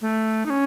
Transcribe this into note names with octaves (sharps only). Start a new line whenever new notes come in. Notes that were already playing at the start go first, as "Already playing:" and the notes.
A3
D#4
C#4